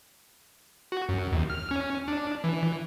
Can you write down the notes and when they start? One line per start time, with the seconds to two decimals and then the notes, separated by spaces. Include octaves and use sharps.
0.92 F#4
1.09 F#2
1.32 D#2
1.50 F6
1.71 C#4
2.08 D4
2.44 E3